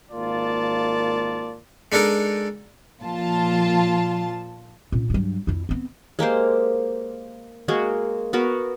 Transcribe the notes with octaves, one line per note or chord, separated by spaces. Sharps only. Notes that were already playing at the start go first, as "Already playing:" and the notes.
G#1 A#3 F4 D5 A5
G#3 D4 D#4 A4 A#4
A#2 F3 F4 A5
A#2 C#4
G2 F#3
F2 E4
B3 C4
G#3 A#3 G4 C5
G#3 A#3 F#4 G#4
B3 F#4 A#4